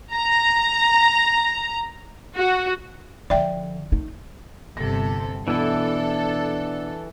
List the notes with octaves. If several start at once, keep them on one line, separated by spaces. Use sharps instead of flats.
A#5
F#4
D3 F3 D5 E5 G5
A3 D#4
G1 C3 A4 A#6
B2 E3 D4 E4 A4